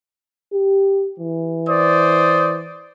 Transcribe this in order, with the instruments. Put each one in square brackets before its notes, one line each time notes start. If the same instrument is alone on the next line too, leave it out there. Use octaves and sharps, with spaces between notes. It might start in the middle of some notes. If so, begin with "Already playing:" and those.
[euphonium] G4
E3
[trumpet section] C5 D5 D#6